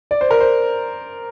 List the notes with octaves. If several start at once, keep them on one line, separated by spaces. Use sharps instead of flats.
D5
C5
A#4
C5